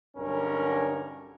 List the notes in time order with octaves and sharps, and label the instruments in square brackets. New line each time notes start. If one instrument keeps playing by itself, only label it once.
[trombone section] B1 G2 D3 C#4 A#4